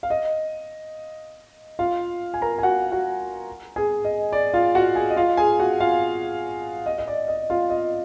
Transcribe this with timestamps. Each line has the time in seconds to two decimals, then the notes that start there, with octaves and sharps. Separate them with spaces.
0.03 F5
0.10 D#5
1.79 F4 F5
2.34 G#5
2.42 A#4 A#5
2.58 G#5
2.63 F#4 F#5
2.92 F#4 F#5
3.76 G#4 G#5
4.05 D#5
4.33 D5
4.54 F4 F5
4.75 F#4 F#5
4.95 G#4 G#5
5.10 D#5
5.17 F4 F5
5.37 G#4 G#5
5.59 F#4 F#5
5.80 F4 F5
6.86 D#5
6.98 D#5
7.08 D5
7.28 D#5
7.50 F4 F5
7.70 D#5